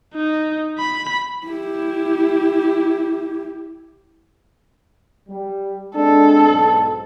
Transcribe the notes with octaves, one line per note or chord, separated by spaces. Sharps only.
D#4
B5
E4 G4
G3
G#3 C4 D4 A4
B1 G#2 A5